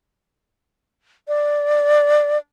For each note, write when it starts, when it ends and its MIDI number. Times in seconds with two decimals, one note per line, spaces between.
1.28 2.38 74